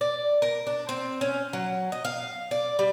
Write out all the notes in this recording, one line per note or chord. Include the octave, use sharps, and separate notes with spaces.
D5
A#4
D4
C4
C#4
F#3
D#5
F5
D5
G3